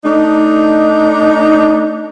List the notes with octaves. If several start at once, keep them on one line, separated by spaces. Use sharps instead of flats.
A3 D4 D#4